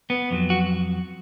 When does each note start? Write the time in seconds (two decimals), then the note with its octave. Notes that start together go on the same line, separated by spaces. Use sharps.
0.10 B3
0.31 F2 D#3 F#3
0.50 F#4